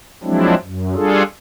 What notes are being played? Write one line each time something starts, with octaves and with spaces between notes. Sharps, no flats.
F3 F#3 G#3 C4 D4 E4
F#2
G3 D4 F4 G#4 A4